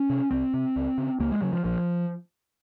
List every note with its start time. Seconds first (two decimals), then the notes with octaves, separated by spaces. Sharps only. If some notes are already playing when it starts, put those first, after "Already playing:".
Already playing: C#4
0.10 C3
0.31 C2 C4
0.54 C3
0.76 C#2
0.98 C#3
1.20 C#2 A#3
1.32 G#3
1.42 C#3 F#3
1.53 F3
1.64 A#1 F3